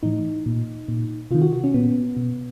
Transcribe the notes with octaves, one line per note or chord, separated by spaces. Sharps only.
A2 E3 D#4
A#2
A#2
C3 D#3 F4
F#4
F#4
C#4
A#2 B3
B2